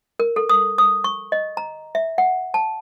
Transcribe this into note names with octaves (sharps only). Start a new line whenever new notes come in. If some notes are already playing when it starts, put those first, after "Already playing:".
A#4
A4
D#6
D#6
C#6
D#5
A#5
E5
F#5
A5